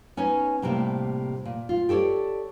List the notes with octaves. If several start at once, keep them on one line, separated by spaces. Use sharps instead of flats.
B3 C#4 D#4 C#5 G#5
A2 C3 G3 A#3 E4
A#2
F4
G4 A4 C#5 D5